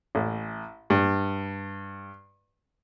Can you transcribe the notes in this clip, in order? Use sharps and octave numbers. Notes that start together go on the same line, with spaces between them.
A1
G2